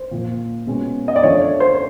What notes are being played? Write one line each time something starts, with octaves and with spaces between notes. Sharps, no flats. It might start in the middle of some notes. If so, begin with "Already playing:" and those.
Already playing: C5
A#2 F3 A#3
B2 G#3 C#4
D#5
D5
F3 A3 D4 C#5
C#5
C5